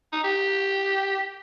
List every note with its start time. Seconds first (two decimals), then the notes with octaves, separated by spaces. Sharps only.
0.12 D#4
0.24 G4